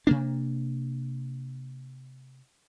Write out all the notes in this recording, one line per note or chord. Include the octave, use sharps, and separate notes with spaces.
C3 A#3 D4